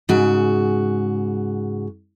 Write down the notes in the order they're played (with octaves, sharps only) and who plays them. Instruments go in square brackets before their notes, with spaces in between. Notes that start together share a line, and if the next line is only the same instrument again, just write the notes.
[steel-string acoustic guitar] G#2 C#3 F#4